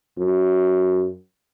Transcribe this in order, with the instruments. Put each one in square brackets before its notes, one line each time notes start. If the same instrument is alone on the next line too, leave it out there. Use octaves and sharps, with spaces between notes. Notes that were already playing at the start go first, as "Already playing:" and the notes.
[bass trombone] F#2